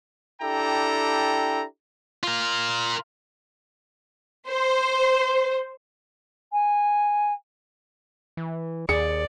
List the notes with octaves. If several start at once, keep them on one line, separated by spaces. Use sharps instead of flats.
D4 E4 G4 A4 G5 A#5
F4 A#4
C5
G#5
E3
D#2 G#4 D5 C#7